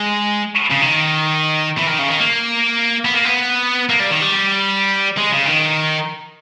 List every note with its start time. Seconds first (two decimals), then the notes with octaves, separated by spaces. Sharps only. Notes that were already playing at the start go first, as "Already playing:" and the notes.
Already playing: G#3
0.71 C#3
0.81 D#3
1.77 E3
1.87 D#3
1.99 C#3
2.08 D#3
2.20 A#3
3.05 B3
3.14 A#3
3.25 B3
3.89 A#3
4.00 G3
4.11 D#3
4.21 G3
5.17 G#3
5.32 C#3
5.46 D#3